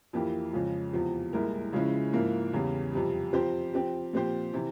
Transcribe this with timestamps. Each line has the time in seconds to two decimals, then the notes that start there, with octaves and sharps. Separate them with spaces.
0.13 F2 E3 A#3 E4 G4
0.53 F2 C#3 F3 G#3
0.93 E2 C3 F3
1.33 C2 A#2 G#3 E4 A#4
1.73 C#3 F3 G#3 C#4 E4
2.13 G#2 F3 A#3 E4
2.53 E2 C#3 E3 G3
2.93 F2 C3 G3
3.33 F3 C4 G4 C5
3.74 F3 C4 G4
4.13 A#2 F3 C4 G4 C5
4.53 C3 E3